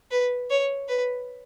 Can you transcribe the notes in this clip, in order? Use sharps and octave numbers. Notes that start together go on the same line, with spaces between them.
B4
C#5
B4